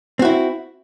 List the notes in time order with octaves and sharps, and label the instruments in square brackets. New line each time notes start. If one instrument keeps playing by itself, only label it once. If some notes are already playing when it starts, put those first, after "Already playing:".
[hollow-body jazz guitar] C4
F#4
E4